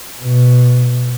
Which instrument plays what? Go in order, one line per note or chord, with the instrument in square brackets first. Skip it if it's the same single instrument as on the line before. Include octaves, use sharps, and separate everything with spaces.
[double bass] B2